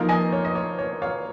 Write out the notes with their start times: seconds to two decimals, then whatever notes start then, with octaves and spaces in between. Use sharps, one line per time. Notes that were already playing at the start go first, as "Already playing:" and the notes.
Already playing: F3 A#3 D#4 F5 A#5
0.09 D#5 G#5
0.33 C#5
0.45 D#5
0.55 C#5
0.79 C#5
1.02 C#5 F5